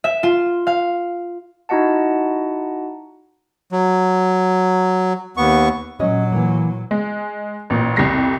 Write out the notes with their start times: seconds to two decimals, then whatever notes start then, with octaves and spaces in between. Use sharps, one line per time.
0.04 E5
0.23 F4
0.67 F5
1.69 D#4 E4 F#4 D#5 F#5 A5
3.72 F#3
5.37 D#2 B3 C#6
6.00 A#2 F#3 C#4 D#5
6.32 E3 A#3
6.91 G#3
7.70 A1 A#2
7.96 C2 F2 G3 A#6 C7